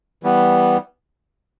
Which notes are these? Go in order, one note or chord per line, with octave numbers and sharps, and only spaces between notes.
E3 G3 B3